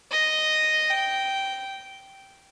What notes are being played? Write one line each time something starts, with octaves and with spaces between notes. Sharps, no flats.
D#5
G5